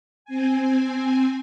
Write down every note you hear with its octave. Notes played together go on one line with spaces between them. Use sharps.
C4 G#5